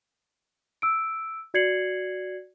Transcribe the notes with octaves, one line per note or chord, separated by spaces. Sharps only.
E6 D7
F#4 D5 G#6 C7 C#7 F#7